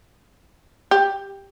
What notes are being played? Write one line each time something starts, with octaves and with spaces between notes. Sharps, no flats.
G4